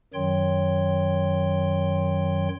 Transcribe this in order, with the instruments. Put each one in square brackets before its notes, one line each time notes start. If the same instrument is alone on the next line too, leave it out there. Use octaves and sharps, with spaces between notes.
[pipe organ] F#2 D#3 F#3 C#5 G5 C6